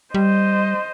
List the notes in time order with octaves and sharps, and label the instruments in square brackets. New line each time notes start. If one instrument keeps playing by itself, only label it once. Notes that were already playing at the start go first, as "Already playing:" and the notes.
[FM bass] G3 [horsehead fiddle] C5 D#5